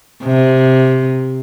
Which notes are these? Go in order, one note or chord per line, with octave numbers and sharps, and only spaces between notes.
C3